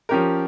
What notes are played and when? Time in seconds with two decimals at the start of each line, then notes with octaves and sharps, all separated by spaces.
0.09 F3 C#4 G4 A#4